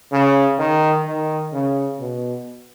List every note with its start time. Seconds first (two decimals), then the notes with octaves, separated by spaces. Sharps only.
0.12 C#3
0.59 D#3
1.06 D#3
1.53 C#3
2.00 B2